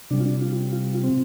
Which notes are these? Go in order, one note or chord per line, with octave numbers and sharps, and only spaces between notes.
C3 G3 D4
F4
D4
F4
F4
C4